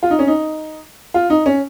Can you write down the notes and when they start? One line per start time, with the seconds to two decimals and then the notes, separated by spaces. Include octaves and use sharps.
0.03 F4
0.10 D#4
0.19 C#4
0.27 D#4
1.14 F4
1.30 D#4
1.46 C#4